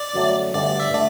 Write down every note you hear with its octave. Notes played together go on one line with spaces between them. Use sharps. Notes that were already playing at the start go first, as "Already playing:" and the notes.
Already playing: D5
G1 F#2 F#3 A3
G1 G2 D3 A3 D5
D5
E5
D3 A3 D5